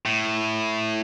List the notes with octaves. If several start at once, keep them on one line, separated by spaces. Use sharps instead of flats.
A2